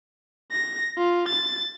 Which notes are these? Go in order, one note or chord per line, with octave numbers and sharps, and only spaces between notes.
A#6
F4
A6